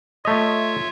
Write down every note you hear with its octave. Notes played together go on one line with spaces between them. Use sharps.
A3 F4 C#5 D#5 E5